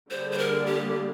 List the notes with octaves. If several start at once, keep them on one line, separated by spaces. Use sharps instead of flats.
D3 G3 A#3 D4 G#4 C5
C5
A#4
G4